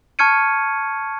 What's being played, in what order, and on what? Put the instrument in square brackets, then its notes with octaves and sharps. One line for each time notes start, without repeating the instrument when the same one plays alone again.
[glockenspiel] A5 C#6 F6 G#6 C#7 D#7